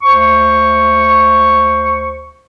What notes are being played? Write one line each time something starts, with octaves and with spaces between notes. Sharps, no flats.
D2 C5 C#6